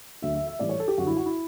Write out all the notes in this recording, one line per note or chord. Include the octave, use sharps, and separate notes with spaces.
D2 D3 F#3 E5
E5
E5
A2 E3 G3 D5
C#5
A4
G4
F#2 D3 G3 F#4
E4
F#4
E4